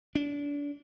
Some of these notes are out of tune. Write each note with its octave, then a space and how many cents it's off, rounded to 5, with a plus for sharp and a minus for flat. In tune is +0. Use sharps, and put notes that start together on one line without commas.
D4 -30